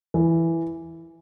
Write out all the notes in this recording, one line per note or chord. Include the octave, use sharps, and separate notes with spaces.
E3